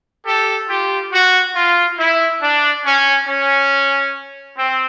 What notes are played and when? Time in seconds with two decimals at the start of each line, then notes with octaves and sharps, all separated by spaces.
0.26 G4 A4
0.69 F4 G4
1.12 F#4
1.55 F4
1.98 E4
2.42 D4
2.85 C#4
3.27 C#4
4.58 C4